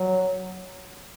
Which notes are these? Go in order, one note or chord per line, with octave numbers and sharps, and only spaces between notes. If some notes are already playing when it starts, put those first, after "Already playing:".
Already playing: F#3